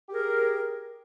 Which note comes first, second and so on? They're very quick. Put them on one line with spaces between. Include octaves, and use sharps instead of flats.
G4 G#4 A#4